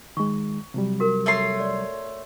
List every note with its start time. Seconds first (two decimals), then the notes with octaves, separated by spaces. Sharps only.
0.17 D#3 G#3 C#6
0.74 C3 F#3 G3
1.00 F#4 A#4
1.26 A3 C#5 C6
1.60 D5